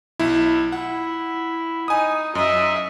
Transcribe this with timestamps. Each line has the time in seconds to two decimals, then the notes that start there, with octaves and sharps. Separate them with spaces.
0.19 B1 E4
0.72 E4 F#5
1.88 D#4 G#5 D#6
2.35 F#2 D#5 E5